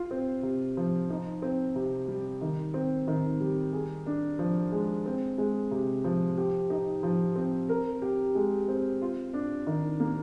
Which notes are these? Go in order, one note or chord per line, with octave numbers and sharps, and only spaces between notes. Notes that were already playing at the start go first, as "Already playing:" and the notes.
Already playing: F4
C4
C3
F3
D#4
C4
C3
G3
D#3
C4
D#3
G3
G#4
D4
F3
G#3
C4
G#3
C3
F3
G4
D#4
F3
C4
A#4
G4
G#3
C4
F4
D4
D#3
A#3